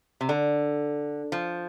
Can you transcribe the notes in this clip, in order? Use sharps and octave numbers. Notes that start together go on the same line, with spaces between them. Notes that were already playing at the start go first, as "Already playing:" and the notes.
C3
D3
F3